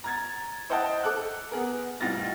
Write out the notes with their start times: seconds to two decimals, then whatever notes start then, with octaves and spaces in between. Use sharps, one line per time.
0.04 A#5 G#6 A6
0.69 E4 C5 D#5 F#5 G5 A5
1.03 A4 D6 F#6
1.51 B3 G#4 A#4
2.00 C2 A2 D#4 F4 A6 A#6